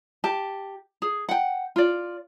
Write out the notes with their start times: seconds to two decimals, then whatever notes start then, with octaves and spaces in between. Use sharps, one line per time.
0.24 G4 A5
1.02 G#4
1.29 F#5 G5
1.76 F4 D5